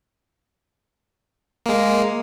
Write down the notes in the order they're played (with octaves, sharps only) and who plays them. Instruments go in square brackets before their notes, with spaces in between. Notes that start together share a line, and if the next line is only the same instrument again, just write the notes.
[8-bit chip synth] G#3 A#3